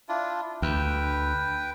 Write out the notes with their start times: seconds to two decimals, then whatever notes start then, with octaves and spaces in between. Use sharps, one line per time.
0.09 D4 E4 F4
0.62 D2 B4 G5